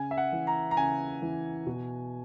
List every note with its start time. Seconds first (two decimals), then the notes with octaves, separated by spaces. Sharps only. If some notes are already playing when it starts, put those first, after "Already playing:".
Already playing: C#3 G#5
0.11 E5
0.17 F#5
0.32 E3
0.47 A#5
0.71 A#5
0.77 C#3 G#5
1.22 E3
1.66 B2